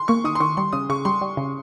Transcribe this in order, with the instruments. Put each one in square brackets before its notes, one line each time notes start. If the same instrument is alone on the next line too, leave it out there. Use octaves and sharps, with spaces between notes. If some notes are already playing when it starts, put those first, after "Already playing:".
Already playing: [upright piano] C6
[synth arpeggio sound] A#3 [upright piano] C#6
[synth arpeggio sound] D#3 [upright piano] D#6
[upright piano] C6
[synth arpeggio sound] D#3 [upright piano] C#6
[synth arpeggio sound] G3 [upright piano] C6
[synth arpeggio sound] C#3 [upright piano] D#6
[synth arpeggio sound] C#3 [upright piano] C#6
[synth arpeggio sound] G3 [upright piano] C6
[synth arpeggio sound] G3
C#3